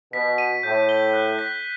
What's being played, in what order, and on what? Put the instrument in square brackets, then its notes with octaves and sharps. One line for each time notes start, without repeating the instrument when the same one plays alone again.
[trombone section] B2 [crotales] B6
[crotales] D#7
[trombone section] A2 [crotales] G6
[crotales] G7
F#6
B6